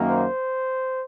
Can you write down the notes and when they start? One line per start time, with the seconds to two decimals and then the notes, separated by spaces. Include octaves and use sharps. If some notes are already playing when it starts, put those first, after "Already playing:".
Already playing: F#2 D#3 F#3 A#3
0.09 C5